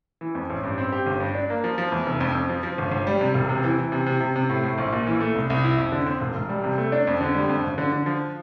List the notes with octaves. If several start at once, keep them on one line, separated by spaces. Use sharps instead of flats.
E3
F2
A1
G2
C4
G4
G1
G2
D4
A#3
F3
F3
E2
F1
F2
F2
F3
F3
G1
G1
G3
C3
E1
C3
E3
E3
C3
C3
C3
C3
A2
A2
A#1
A#2
E3
A3
C2
C2
E4
F2
D3
C4
E1
E1
G3
C3
A3
D4
F2
D3
G3
F2
G1
D3
D3
F3